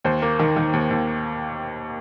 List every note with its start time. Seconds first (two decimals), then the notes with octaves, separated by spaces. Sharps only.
0.04 D#2 C5
0.22 A#3
0.39 D#3
0.56 D#3
0.73 D#2
0.90 D#2